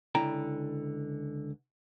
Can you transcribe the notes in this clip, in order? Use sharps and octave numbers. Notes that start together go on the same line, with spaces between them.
C#2 D3 E4 G5 A#5